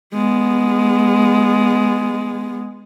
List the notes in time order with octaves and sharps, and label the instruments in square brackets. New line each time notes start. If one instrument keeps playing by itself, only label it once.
[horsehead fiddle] G#3 B3